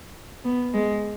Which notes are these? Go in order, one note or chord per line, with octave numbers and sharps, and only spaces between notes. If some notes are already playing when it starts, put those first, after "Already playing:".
B3
G#3